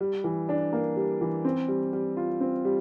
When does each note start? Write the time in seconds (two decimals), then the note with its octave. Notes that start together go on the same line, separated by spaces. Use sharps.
0.01 G3
0.24 E3
0.49 D4
0.73 A#3
0.96 G3
1.21 E3
1.45 C4
1.68 G3
1.93 G3
2.17 F4
2.41 C4
2.65 G3